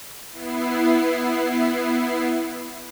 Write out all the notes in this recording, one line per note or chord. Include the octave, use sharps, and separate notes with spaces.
B3 E4 C7